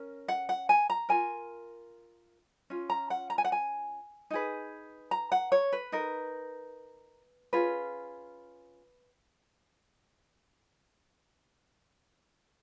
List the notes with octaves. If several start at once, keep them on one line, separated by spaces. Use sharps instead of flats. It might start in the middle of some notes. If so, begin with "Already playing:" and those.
Already playing: C#4 A#4
F#5
F#5
G#5
A#5
F4 A#4 G#5
C#4 F4
A#5
F#5
A#5
G#5
F#5
G#5
D#4 G#4 B4
A#5
F#5
C#5
B4
D#4 A#4
C#4 F4 G#4 B4